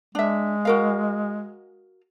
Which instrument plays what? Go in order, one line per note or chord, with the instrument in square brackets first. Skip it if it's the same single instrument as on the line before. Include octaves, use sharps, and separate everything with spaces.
[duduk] G#3 [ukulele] D4 E5
[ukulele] F#4 A#4 F5